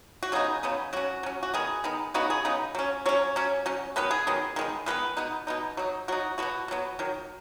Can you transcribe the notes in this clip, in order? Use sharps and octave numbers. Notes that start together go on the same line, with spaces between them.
F#4
C#3 F#3 B3 D#4 G#4
C#3 F#3 B3 D#4
F#3 C#4 F#4
F#3 C#4
F#4
D#3 B3 D#4 G#4
D#3 B3 D#4
C#3 B3 D#4 F#4
G#4
C#3 B3 D#4
F#3 C#4
F#3 C#4 C#5
F#3 C#4
F#3 C#4
D#3 F#3 B3 B4
G#4
D#3 F#3 B3
D#3 G#3 B3
D#3 G#3 B3 B4
B2 B3 D#4
B2 B3 D#4
F#3 D#4
F#3 D#4 F#4
B2 F#3 B3 F#4
B2 F#3 B3
D#3 F#3